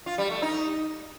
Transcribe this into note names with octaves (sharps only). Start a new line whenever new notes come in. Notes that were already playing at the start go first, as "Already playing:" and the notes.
F4
G3
A3
D#4